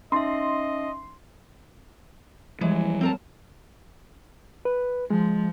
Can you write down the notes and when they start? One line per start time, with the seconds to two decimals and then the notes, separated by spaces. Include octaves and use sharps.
0.12 C#4 D#4 D#5 E5 C6
2.61 E3 F3 G3 G#3
3.01 C4 A#4 A5
4.65 B4
5.10 F3 G#3